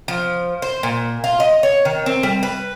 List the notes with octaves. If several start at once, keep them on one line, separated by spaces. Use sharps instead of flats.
F3
C5
A#2
F4
D#5
C#5
D#3
C4
G3
B4